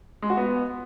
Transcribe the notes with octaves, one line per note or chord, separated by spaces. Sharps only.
G#3
F#4
B3